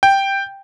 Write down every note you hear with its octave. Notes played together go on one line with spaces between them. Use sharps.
G5